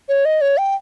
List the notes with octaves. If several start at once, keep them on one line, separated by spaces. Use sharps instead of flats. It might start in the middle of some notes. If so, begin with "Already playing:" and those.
C#5
D#5
C#5
G5